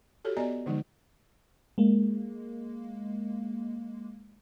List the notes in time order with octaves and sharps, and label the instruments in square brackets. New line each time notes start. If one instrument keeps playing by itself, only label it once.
[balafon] F#4 G4 A4 C#5
B3 D5 D#5 G#5 A#5
D3 E3 F3 G#3 D#4
[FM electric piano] G#3 A#3